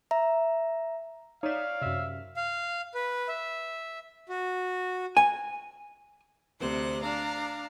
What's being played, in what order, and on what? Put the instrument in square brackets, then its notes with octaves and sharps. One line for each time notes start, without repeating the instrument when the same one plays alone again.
[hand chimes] E5 A#5
[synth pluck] D#4 E5 [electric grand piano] C#5 D5 [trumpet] F5
[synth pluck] F#2 C3 [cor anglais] E5
[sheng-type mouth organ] F5
B4
E5
F#4
[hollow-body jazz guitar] G#5
[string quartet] D2 C3 C5 F#6
D4 F5 A#5